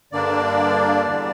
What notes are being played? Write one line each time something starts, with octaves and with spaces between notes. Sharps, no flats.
G2 D3 A#3 D4 D5
E2 D3 G3